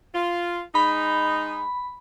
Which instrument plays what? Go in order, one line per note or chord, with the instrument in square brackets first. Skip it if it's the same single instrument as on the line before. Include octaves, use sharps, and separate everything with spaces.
[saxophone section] F4
[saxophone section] G#3 D#4 [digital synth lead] B5